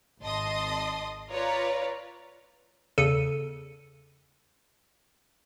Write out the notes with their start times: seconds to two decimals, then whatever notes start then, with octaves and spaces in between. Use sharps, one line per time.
0.21 G#1 D#5 A5 C6 D#6
1.30 F4 B4 C#5 D5 A#5
2.98 E2 C#3 A4 C#7 D#7